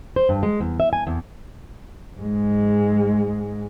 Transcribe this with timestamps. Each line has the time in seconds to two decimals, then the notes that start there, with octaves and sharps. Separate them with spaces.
0.16 C5
0.29 G2
0.43 G#3
0.60 E2
0.80 E5
0.93 G#5
1.07 E2
2.18 G#2 G#3